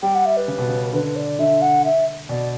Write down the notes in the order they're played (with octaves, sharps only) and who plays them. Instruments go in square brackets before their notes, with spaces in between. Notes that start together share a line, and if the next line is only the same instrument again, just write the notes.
[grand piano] G3 [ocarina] G5
[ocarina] F#5
E5
B4
[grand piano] C#3
B2
C#3
[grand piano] D3 [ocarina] B4
[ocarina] D5
[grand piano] D3 [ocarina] E5
[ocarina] F#5
E5
[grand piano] B2 [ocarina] D5